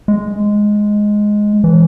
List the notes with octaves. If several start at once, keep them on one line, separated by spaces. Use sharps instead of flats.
G#3
E3